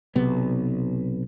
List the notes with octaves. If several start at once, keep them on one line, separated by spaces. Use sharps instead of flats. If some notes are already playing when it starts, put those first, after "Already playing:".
B1 C3 B3